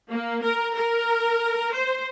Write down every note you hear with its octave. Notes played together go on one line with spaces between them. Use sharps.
A#3
A#4
A#4
C5